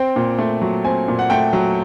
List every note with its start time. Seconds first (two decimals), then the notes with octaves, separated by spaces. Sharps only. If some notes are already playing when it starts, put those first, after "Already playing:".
Already playing: C4 G5
0.16 A#2
0.39 A3
0.62 F#3
0.84 C4 G#5
1.08 A#2
1.19 F#5
1.30 A3 G5
1.53 F#3